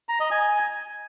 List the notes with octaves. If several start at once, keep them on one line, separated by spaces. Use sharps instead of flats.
A#5
D#5
G#5